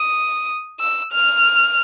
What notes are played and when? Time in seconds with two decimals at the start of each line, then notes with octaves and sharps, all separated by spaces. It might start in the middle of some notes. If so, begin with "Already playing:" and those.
Already playing: D#6
0.80 E6
1.12 F6